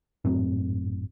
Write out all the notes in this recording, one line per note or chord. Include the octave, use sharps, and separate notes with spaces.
G#1 F#2 A2 C4